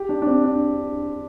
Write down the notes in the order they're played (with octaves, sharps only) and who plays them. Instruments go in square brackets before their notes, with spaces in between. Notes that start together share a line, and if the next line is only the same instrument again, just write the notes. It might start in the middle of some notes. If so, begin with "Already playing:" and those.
Already playing: [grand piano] G4
D4
D4
C4
D4